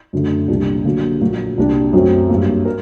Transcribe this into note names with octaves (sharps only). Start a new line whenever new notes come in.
F#2 D3 A3
C2 A#2 G3 D4
D3 F#3 A#3
A#1 A#2 F#3 A#3 F#4
C2 A#2 G3 D4
F#2 F#3 A3 C4
G2 F#3 A#3
A#4